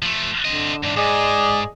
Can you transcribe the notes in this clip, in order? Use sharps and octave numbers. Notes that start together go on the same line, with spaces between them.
F3 A3
D3 C4 D#5
G#2 E3 D4
G#2 G#4 D5 D#5